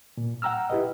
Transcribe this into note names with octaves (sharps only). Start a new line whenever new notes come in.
A#2
F#5 G5 A#5 E6 F6
E4 G4 B4 D#5